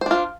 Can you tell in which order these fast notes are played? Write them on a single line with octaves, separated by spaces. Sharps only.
C5 D4 F4